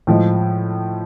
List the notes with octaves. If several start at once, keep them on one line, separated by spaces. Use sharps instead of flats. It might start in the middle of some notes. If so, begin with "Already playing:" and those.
A2 F3 G#3